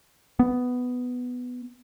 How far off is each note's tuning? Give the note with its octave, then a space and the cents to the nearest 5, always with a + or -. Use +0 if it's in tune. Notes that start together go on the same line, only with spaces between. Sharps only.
B3 +5